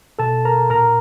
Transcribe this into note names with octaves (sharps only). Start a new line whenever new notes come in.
B2 A4 A5
A#4 A#5
A#2 A#4 A#5